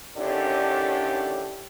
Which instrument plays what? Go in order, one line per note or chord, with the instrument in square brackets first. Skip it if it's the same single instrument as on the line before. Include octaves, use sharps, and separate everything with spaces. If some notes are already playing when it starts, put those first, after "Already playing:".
[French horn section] A2 D3 D#3 C#4 D4 G4